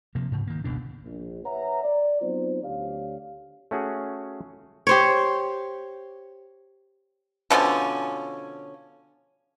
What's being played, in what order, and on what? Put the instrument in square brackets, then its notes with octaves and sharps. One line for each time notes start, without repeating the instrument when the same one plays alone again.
[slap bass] C3 F3 A#3
G#2 C#3
D#3 A#3
F#1 D2 B2 D4
[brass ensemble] A#1
B4 C#5 E5 F#5 A#5
D5
F#3 B3 C4 D#4 F4 C5
D2 G4 C#5 D5 F5
[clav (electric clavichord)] A3 C#4 F#4 G#4
[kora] G4 C5 C#5
[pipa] B2 D3 F3 C#4